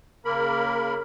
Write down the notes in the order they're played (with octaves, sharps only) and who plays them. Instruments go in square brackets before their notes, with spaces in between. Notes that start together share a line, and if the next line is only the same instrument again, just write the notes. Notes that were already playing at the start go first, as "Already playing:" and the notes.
[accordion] C#3 A#3 A#4 B5